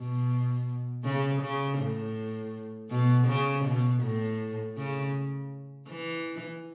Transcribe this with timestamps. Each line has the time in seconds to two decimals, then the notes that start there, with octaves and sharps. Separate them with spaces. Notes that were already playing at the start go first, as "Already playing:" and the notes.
Already playing: B2
1.04 C#3
1.41 C#3
1.78 A2
2.90 B2
3.28 C#3
3.65 B2
4.03 A2
4.77 C#3
5.89 E3